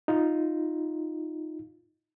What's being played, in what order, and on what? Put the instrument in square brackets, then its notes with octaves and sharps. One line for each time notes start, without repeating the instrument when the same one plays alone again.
[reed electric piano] D#4 F4